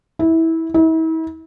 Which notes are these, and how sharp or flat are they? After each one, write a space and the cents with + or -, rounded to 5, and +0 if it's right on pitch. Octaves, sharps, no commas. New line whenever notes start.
E4 -20
E4 -40